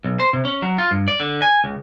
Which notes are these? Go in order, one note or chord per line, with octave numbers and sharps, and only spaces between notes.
B1
C5
C3
C#4
F#3
F4
G2
D5
D3
G#5
C#2